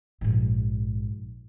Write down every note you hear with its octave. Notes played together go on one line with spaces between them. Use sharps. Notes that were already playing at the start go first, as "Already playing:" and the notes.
A#1 G#2